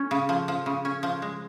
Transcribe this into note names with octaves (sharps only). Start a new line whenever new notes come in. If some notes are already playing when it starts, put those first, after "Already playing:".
Already playing: C#4
C#3
F3
F3
C#3
C#4
F3
G#3